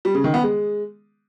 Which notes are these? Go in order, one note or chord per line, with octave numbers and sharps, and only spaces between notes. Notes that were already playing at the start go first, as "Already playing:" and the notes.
G3
C#3
D#3
B3
G#3